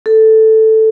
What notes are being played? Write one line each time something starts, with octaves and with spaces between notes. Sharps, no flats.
A4